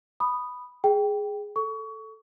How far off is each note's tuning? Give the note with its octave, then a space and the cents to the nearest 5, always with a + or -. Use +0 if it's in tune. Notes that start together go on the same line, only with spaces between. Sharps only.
B5 +0 D#6 -10
G#4 +0 G5 +0
A4 +0 C#6 +25